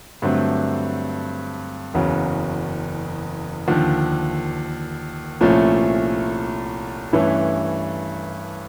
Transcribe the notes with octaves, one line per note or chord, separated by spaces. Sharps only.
G2 D3 F#3 A3 C4
F#1 E2 C#3 F#3
D#2 D3 F3
C2 A#2 F3 A3 C#4
G2 E3 A3 C#4 E4